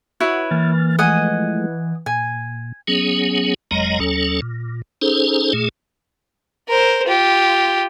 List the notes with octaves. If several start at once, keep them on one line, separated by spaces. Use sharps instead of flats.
E4 F#4 B4 C#5
E3 A#3 F6 A6
F3 G#3 A3 D#5 F#5 G#5
A#2 G#5
F#3 B3 C#4 G#4
F#1 F2 F#3 G#3 D#5 A#5
D#2 F#3 C#4 A4
A#2
C#4 D#4 G#4 A4 C5
A#2 A3 G#4
A#4 C5
F4 G4